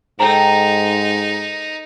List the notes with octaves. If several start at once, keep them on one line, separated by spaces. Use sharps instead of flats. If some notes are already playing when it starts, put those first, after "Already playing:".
G#2 D#4 A4 G5 A#5